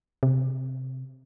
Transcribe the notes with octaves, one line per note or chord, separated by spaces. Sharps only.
C3